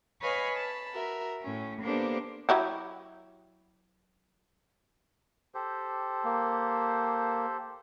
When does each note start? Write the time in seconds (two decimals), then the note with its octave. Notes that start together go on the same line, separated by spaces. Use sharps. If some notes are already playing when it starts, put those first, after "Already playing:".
0.22 B4 C#5 D#5 F5 G#5 B5
0.55 A5 B5
0.93 F#4 A#4 E5
1.43 A2 C#4
1.82 A#3 B3 D4 G4 A4 C5
2.49 F#3 E4 G4
5.55 G4 A4 C5
6.24 A#3